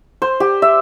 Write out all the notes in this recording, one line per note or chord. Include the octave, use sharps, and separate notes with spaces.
C5
G4
E5